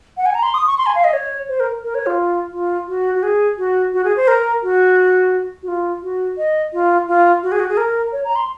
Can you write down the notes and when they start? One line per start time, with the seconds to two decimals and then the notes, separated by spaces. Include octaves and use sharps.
0.17 F#5
0.26 G#5
0.35 A#5
0.43 C6
0.54 D#6
0.67 C#6
0.78 C6
0.86 G#5
0.95 F5
1.04 D#5
1.13 C#5
1.49 C5
1.60 A#4
1.83 A#4
1.95 C#5
2.06 F4
2.53 F4
2.88 F#4
3.15 F#4
3.23 G#4
3.58 F#4
3.94 F#4
4.04 G#4
4.16 C5
4.28 A#4
4.63 F#4
5.63 F#4
5.68 F4
6.03 F#4
6.38 D#5
6.73 F4
7.07 F4
7.43 F#4
7.52 G#4
7.60 F#4
7.69 G#4
7.77 A#4
8.13 C#5
8.25 A#5
8.36 C6